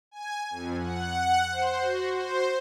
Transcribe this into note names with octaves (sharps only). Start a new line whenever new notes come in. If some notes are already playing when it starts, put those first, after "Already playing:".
G#5
F2
F#5
C5
F#4
C5